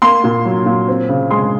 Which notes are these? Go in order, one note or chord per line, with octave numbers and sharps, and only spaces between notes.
A#3 C6
A#2
F#3
A#2
C4
C#3
G#3 C6